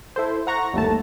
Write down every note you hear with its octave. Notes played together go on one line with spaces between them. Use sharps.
E4 A4 C5
F#5 A#5 C#6 A#6
G1 D#2 A3 A5